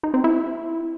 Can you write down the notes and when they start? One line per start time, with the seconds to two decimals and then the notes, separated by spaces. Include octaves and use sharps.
0.03 D#4
0.14 C4
0.24 E4